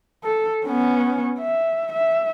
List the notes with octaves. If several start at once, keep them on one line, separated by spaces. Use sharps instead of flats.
A4
B3 C#4
E5
E5